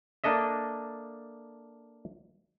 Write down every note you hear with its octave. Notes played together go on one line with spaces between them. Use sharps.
A#3 D4 A4 D#5 E5